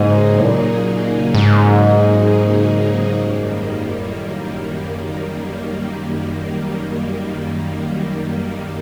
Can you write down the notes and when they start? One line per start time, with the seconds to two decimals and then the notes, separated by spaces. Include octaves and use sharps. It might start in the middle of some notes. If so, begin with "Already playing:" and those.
Already playing: G#2 C#3 F#3 A#3 D#4 G#4
0.39 A2
0.45 A#2
1.34 G#2
3.12 F#2 D#3 G3 A#3
3.94 A#2
4.02 A2
4.83 D3
4.90 C#3